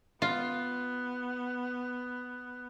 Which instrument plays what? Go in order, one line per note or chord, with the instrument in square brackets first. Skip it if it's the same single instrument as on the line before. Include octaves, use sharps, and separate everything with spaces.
[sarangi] B3 [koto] F4